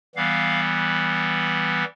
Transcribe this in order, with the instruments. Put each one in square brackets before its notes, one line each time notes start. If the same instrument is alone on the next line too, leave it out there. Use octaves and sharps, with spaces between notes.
[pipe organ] E3 G3 B3 F5